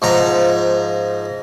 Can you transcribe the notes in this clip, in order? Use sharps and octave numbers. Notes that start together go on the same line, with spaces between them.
G#2 F3 A#5